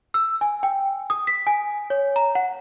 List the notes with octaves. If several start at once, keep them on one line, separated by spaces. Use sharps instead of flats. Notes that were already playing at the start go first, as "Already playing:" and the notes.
E6
G#5
G5
D#6
B6
G#5
C#5
A#5
F#5